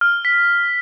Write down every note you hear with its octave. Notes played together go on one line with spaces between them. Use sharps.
F6
B6